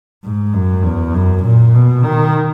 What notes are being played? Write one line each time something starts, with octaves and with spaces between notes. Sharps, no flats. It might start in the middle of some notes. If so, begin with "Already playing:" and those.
G#2
F#2
E2
F#2
A#2
B2
D#3